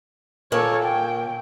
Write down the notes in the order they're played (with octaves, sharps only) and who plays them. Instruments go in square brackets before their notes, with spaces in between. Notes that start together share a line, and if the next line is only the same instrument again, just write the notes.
[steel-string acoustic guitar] A#2 A#3 [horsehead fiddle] A4 C#5
[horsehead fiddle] G5